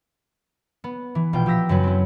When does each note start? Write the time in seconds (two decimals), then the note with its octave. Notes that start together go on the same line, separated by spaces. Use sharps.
0.84 B3
1.15 E3
1.33 A#1 B2 F4 G5
1.46 F3 G4 E6 A#6 B6
1.69 F#2 C#3 F#3 B4
1.83 C4 C#4 E4